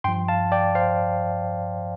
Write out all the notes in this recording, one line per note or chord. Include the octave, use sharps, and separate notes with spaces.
G2 F3 G5 C6
F5 A5
D5 G5
C5 F5